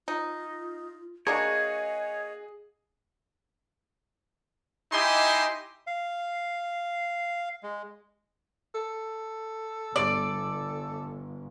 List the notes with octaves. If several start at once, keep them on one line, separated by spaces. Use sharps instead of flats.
D#4 F4
A#3 D4 F#4 G#4 C#5 D#5
D#4 E4 G4 D#5 G#5 C6
F5
G#3
A4
G1 D5